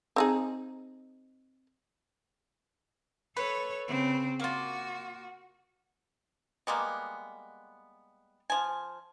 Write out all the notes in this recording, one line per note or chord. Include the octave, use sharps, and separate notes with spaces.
C4 D#4 G#4
A4 B4 C#5
C#3 C4
A#3 F4 F#4
G3 G#3 A#3 B3
F3 G#5